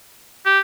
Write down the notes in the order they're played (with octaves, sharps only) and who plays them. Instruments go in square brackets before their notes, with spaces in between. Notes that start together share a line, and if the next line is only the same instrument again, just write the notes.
[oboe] G4